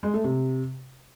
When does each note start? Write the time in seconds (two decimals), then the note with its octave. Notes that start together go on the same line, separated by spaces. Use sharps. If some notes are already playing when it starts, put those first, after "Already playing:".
0.03 G#3
0.14 A3
0.24 C3